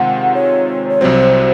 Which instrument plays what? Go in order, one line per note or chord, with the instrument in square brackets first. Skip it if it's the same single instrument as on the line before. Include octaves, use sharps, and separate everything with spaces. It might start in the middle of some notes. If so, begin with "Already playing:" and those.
Already playing: [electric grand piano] C3 D#3 G#3 C4 F4 [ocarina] F#5
[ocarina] C#5
C#5
[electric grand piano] C2 C3 F#3 C4 [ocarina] C5